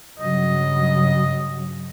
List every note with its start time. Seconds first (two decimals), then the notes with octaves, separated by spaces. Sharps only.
0.19 G2 C#3 F#3 D#5